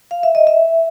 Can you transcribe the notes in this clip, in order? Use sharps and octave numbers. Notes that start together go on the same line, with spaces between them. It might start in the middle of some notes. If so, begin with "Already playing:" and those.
F5
E5
D#5
E5